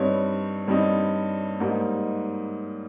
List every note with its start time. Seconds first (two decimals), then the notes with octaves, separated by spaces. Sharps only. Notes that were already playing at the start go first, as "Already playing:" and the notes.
Already playing: G2 G3 C4 D#4 C#5
0.68 G2 G3 C4 D#4
1.60 G#2 G3 A#3 D#4